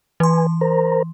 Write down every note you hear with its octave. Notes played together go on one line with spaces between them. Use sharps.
E3 B4 G#5 C6
A#4 C5 A#5